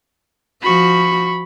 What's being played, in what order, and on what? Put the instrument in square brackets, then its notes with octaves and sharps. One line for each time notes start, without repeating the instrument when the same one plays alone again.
[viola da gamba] F3 F#4 [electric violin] B5 C#6